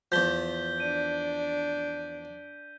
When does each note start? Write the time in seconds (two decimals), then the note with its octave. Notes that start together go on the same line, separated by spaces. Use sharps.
0.12 E2 F3 G6 B6 G7
0.80 D4 D#7